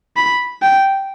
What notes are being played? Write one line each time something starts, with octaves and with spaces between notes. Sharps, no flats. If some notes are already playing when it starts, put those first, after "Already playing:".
B5
G5